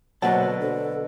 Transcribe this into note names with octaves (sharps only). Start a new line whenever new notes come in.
B2 D3 F#3 A#3 C5 F#5 A5
D4 A4